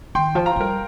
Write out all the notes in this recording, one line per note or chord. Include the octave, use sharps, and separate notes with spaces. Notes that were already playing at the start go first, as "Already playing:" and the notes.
D#3 G5 C6
F3
F5 A#5
G3 A#4